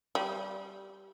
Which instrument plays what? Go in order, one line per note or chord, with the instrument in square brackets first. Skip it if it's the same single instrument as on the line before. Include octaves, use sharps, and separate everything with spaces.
[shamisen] G3